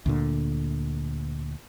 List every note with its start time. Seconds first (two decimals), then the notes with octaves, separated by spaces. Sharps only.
0.06 D2 A#2 D3